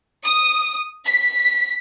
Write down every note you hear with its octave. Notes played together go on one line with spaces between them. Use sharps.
D#6
B6